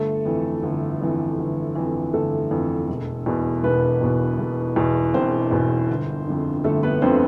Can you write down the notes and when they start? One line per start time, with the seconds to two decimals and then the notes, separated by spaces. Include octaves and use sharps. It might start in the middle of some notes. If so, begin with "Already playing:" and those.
Already playing: G1 A3 A4
0.25 F2 E3
0.63 G1
1.01 F2 E3
1.39 G1
1.75 F2 E3
2.14 G1 A3 A4
2.51 F2 E3
2.88 E1
3.26 E2 B2
3.64 E1 B3 B4
4.01 E2 B2
4.39 E1
4.76 E2 B2
5.14 E1 C4 C5
5.51 E2 B2
5.89 G1
6.27 F2 D3
6.64 G1 A3 A4
6.83 B3 B4
7.02 F2 D3 C4 C5